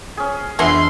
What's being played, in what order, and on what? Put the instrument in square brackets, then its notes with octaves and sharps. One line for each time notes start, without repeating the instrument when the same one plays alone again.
[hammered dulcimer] C#4 G#4
[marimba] F2 E3 D4 [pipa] G#3 A3 B3 [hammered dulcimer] E5 [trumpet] C6